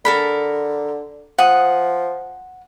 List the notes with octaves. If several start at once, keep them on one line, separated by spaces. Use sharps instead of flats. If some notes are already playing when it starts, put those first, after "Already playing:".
D3 A4 A#4 B5
F3 F#5 D#6